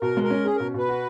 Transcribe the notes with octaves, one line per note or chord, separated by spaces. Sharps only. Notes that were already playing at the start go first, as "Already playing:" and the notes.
B2 A#4
G#3
A#4
C#4
C#4 G#4
B2 A#4
B2 B4
F#4